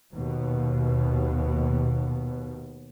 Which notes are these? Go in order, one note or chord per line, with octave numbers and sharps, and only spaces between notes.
D#2 B2